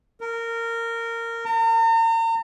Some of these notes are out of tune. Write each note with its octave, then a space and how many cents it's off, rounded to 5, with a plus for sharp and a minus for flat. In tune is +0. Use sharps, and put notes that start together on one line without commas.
A#4 -15
A#5 -40